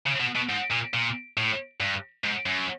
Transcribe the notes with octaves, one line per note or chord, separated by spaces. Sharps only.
C#3
B2
B2
G#2
A#2
A#2
A2
G2
G#2
F#2